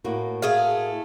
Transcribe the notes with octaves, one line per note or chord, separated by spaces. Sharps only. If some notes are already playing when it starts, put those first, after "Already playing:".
A2 A#3 F#4
A3 G#4 F5